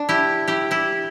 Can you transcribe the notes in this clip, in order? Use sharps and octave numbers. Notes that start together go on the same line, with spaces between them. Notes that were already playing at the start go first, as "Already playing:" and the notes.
Already playing: D4
E4 G4
E4 G4
E4 G4